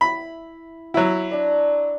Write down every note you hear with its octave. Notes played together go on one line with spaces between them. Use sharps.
E4 B5
F#3 E4
D4 D5